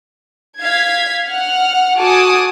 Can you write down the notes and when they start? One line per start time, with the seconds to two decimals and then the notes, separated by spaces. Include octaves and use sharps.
0.61 F5 G#6 B6
1.25 F#5 F6
1.98 F#4 A4 G#5 A5 D6 D#6